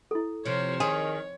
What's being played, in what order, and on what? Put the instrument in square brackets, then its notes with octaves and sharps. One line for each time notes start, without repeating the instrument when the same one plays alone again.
[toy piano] E4 A4
[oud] C3 F3 [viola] C5 C#5
[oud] D#3 [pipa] G#4 [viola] C#5